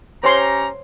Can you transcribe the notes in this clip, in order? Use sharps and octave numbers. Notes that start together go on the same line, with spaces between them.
C#4 G4 C5 C#5 A#5 C6